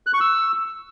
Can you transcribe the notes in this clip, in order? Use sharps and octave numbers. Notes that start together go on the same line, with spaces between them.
F#6
C#6
E6